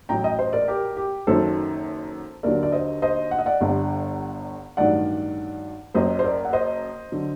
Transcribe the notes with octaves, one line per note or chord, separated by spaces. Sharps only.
A1 A2 F#3 G5 A#5
D#5 G5
C5 D#5
A#4 D5
G4 A#4
G4
F#1 F#2 D#3 F#3 A4 C5
D#2 D3 F#3 A#4 D5
D5
C5 D#5
C5 D#5
F#5
D#5
D5 F#5
G1 G2 D3
A1 G2 D#3 F#3 D5 F#5
F#1 F#2 F#3 C5 D#5
C5
A#4 D5
F#5
C5 D#5
D3 F#3